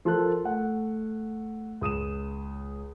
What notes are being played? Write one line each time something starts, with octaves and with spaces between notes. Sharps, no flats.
F3 F4 A4 A#4 A5 F#6
A3 F#5
C#2 D#6 D#7 E7